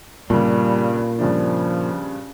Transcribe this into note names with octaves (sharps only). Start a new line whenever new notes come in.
G2 A#2 C#3 G3
G2 C#3 F3 D4